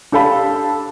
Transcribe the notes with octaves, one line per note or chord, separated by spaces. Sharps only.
D4 G4 A4 F5 B5